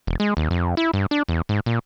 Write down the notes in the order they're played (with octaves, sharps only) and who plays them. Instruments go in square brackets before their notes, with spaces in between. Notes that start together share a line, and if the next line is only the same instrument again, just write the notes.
[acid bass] E1
G#3
D#2
F2
E4
G2
D4
E2
G#2
A#2